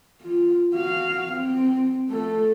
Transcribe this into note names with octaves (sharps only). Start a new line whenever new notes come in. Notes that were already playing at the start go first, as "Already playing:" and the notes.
F4
F#4 F5
C4
A3 A4